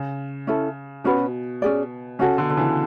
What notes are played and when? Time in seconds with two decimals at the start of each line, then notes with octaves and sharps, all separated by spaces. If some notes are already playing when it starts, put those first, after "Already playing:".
Already playing: C#3
0.47 C#4 E4 A4
1.04 B2 C#4 F#4 B4
1.62 C#4 G#4 D5
2.19 C#3 C#4 F#4 A4
2.38 B2 D3
2.50 D3
2.57 C#3 E3